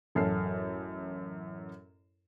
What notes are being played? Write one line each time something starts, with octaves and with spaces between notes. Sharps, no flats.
A1 F#2 F#3 A4 F6 C7